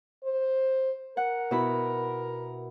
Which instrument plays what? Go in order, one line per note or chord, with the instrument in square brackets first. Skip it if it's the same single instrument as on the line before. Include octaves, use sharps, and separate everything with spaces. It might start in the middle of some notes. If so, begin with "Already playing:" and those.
[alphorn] C5
[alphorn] A#4 [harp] F#5
[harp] B2 E4 B5